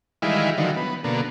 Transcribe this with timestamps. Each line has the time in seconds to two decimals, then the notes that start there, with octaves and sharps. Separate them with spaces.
0.22 D#3 E3 G3 G#3 E4 F4
0.58 D3 D#3 F3 F#3
0.77 B3
1.04 B2 D3 A#3